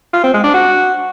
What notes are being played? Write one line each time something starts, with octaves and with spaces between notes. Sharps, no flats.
F4
C4
G#3
D4
F#4